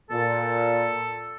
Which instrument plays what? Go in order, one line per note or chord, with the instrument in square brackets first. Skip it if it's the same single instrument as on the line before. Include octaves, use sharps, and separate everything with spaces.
[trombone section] A#2 [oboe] A4